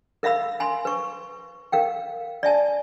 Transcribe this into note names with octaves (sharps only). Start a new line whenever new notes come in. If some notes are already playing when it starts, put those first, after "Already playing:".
A#4 E5 F5 B5 E6
G#5 B5 C6
B4 C#6
A#4 F5 G5
D5 E5 G#5 A5